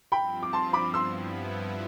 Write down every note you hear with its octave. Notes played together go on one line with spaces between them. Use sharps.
G2 F3 C4 G5 B5
D6
A5 C6
B5 D6
G2 F3 B3 E4 C6 E6